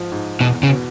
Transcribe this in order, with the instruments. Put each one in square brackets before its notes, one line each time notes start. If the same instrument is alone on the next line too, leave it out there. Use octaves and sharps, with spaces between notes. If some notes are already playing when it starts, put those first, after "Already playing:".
Already playing: [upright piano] G#2 F3
G#2
[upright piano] E2 [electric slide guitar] B2
[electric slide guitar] C#3
[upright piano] B2